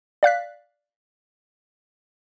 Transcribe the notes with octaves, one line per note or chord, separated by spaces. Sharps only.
D5 F5 F#6 B6